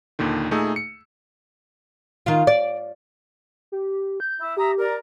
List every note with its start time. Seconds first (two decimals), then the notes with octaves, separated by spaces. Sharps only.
0.19 D#2 A#2 D3 D#3
0.51 A#2 A3 D#4 G#4 E6
0.76 C#7
2.26 D#3 F4
2.47 D5
3.72 G4
4.20 G6
4.38 E4
4.57 G4 E5 A#5 D#6
4.78 A#4 D5 A#5